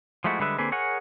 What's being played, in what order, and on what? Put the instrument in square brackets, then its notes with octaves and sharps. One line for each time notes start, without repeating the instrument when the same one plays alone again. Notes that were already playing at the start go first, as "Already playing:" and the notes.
[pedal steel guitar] F3 G#3 A3 E4 F#4
D3 G3 G#3 B4 E5
D3 A#3 C4 G#4 B4
G#4 A#4 C#5 F#5 G#5